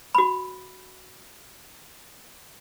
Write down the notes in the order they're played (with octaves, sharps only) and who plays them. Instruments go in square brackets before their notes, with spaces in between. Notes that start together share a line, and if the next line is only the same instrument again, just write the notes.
[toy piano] F#4 B5